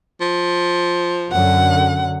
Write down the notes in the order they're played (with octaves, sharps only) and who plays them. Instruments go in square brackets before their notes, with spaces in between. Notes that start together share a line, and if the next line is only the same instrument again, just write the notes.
[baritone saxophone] F3
[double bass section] F#2 D3 [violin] F#5